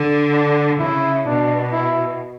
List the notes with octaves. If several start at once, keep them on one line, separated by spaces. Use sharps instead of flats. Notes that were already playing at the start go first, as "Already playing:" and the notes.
Already playing: D3
D4
C#3 E4
B2 D4
E4